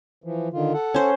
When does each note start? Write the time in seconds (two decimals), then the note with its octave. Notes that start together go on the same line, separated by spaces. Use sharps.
0.24 E3 F3
0.53 D3 D#3 F4
0.73 A4 F#5
0.94 C#4 C5